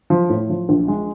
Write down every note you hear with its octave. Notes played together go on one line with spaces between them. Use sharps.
F3
A2
F3
A#1
G#3